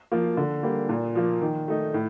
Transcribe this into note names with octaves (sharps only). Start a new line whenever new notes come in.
F3 A#3 F4
D3
G3 A#3
A#2
F3 A#3
D#3
A3 D#4
A2